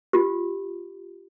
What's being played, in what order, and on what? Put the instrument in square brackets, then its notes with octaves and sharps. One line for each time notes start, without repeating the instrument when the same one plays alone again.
[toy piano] F4 G4